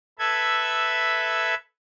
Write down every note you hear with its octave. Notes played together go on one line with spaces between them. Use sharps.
A4 B4 E5 G#6